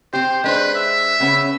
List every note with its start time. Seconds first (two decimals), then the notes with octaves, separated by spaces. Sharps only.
0.13 C4 G4 C5
0.44 G#3 D4 B4 C5
0.75 E5
1.20 C#3 B3 C#4